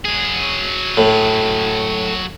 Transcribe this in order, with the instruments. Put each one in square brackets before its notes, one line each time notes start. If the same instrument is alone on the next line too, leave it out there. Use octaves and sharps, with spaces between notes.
[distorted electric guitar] F#3 G#4
[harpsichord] A2